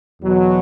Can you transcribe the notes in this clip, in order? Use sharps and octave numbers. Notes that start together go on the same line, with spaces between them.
E2 B2 F#3